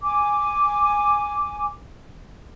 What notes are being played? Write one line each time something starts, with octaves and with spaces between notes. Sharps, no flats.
G#5 D6